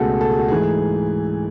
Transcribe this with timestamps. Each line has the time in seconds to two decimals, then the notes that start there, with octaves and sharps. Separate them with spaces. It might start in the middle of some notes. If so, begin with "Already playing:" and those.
Already playing: C#2 B2 A3 F#4 G#4 A4
0.21 A4
0.30 G#4
0.39 F#4
0.48 G#2 E3 A3 G#4